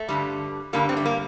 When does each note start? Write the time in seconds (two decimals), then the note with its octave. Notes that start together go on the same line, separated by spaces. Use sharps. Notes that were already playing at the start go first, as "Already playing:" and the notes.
Already playing: A3
0.08 G2 D3 G3
0.73 G2 D3 G3 A#3
0.89 C4
0.97 A3
1.06 A#3